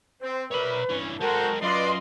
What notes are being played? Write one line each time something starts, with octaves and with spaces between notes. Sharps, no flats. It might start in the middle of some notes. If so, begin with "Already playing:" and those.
C4 C5
G3 A#4 B4 C#5 E5 B5
G2 E3 C#4
G#3 F#4 G4 A4 A#4 C5
F#2 F4 B4 D5 D#5 C6